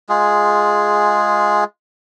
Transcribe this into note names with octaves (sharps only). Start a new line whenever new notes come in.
G#3 F4 G#4